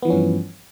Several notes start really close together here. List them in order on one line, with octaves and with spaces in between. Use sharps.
B3 E3 F3 C#4 G2